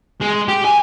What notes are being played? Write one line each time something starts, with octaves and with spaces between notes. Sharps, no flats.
G#3
G4
G#5